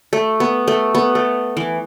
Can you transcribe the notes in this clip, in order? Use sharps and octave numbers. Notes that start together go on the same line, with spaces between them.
A3
B3
A3
B3
A3
E3